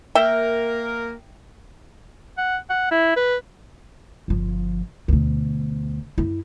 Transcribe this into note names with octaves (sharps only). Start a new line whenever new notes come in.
A#3 A#4 E5 G5
F#5
F#5
E4
B4
G1 F3
D2 B2
F#2 E4